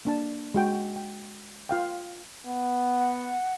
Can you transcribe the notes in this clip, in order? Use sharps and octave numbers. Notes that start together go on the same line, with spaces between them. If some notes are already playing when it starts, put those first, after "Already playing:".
A#3 D4 A5
G#3 F#4 G5
G5
F4 F5 G5
B3
F#5